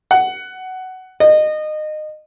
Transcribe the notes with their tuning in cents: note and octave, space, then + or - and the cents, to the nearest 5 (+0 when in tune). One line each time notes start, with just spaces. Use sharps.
F#5 +15
D#5 -25